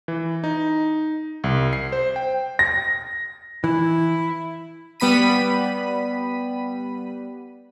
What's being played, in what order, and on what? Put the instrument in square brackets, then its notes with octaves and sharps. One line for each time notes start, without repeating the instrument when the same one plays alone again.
[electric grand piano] E3
D#4
C2
C7
C5
G5
[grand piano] A#6
[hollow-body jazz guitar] E3 [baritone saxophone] E4
[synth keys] G3 B3 B5 B6 D#7